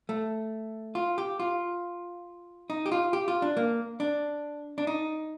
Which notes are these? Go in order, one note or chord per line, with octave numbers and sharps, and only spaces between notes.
A3
F4
G4
F4
D#4
G4
F4
G4
F4
D4
A#3
D4
D4
D#4